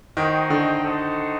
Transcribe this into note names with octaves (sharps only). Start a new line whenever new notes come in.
D#3 D#4 F#4 C5 D#5 G5
D3
D#4 F#4 A4 C5 D#5